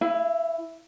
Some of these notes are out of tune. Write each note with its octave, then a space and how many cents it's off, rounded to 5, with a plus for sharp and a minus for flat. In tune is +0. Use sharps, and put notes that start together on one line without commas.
E4 +0 F5 -45